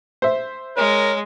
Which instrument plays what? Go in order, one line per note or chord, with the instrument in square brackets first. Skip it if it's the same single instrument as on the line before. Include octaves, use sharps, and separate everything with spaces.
[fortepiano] C5 E5
[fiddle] G#3 [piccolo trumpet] A#4 [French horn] C#5